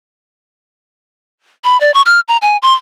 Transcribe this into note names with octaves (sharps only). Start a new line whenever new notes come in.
B5
D5
C#6
F6
A#5
G#5
C6